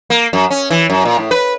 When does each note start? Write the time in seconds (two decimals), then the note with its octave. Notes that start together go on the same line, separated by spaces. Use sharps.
0.10 A#3
0.33 F#2
0.50 C#4
0.70 E3
0.90 F#2
1.05 A#2
1.19 A2
1.31 B4